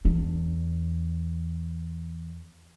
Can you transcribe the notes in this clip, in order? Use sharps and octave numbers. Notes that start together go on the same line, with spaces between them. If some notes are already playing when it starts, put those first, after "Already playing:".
E2 D4